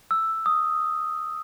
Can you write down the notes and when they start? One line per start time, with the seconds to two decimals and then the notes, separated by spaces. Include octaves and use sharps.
0.11 E6
0.46 D#6